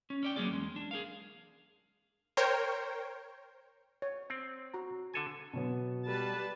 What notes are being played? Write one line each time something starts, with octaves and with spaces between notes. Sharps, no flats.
C#4
C#4 D5 G5
F#3 A#3 C#4 G#4 D5
E2 G#3
D4
G#4 A#4 F5
A#4 C5 C#5 G5
C#5
C4
F#4 A#5
D3 A4 G#5
B2 F#3 B3
G3 B4 A5